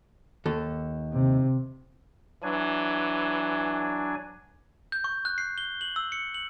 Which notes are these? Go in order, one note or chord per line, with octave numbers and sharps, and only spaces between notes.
D#2 A4
C3
E3 F#3 D4 G#5
G6
C#6
F#6
C7
G7
F#7
E6
C#7
F#7